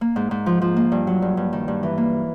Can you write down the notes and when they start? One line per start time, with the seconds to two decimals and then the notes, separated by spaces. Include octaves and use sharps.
0.01 A#3
0.16 G#2
0.31 G#2
0.46 F3
0.62 F3
0.77 A#3
0.92 G2
1.07 F#3
1.22 G2
1.37 G2
1.53 D#3
1.68 G2
1.83 E3
1.98 A#3